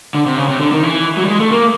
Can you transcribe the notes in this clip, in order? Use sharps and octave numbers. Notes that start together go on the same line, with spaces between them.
D3
C3
C#3
C3
D3
D#3
E3
F#3
G3
G#3
A3
A#3